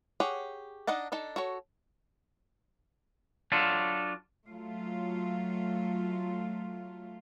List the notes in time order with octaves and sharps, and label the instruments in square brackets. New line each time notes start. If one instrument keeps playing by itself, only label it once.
[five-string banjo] G4 G#4 C#5 F#5
D4 D#4 D#5 F#5 A5
D4 D#4 A4 A5
F#4 A4 C#5
[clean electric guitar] F#3 D4 F4 A4
[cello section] F#3 A3 F4